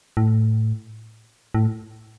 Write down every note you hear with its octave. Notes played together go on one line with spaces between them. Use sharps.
A2
A2